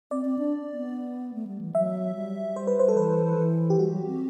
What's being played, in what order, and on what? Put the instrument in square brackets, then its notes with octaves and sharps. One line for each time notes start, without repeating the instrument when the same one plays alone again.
[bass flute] C4 [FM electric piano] D5
[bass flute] C4
D4
B3
A3
G3
E3
[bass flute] F#3 [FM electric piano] E5
[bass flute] G3
[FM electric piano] C5
B4
C5
A4
[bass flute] E3 [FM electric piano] B4
[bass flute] E3
[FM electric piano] G4
[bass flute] G3 [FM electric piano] F#4
[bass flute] F#3
C4